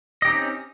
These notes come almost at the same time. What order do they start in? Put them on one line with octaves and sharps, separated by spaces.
D#5 G4 D#4 C4 C#4